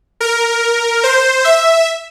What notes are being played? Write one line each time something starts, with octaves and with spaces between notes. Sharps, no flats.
A#4
C5
E5